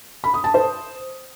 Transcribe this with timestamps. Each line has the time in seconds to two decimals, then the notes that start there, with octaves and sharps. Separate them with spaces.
0.24 B5
0.34 D#6
0.44 A5
0.54 C5